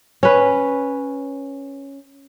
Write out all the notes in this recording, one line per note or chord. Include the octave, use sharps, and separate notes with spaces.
C#4 B4